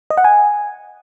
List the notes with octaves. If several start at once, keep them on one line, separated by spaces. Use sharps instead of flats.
D#5
F#5
G#5